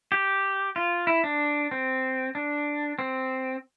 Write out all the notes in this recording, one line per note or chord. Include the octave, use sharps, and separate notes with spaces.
G4
F4
E4
D4
C4
D4
C4